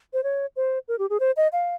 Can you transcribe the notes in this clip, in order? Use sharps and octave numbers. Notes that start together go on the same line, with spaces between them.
C5
C#5
C5
A#4
G4
G#4
C5
D#5
F5